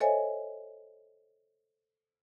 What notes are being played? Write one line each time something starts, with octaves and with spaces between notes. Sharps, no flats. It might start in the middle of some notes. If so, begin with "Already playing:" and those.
A4 C5 C#5 D#5 E5 G#5